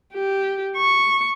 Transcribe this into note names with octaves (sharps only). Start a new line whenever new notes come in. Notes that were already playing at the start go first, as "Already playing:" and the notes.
G4
C#6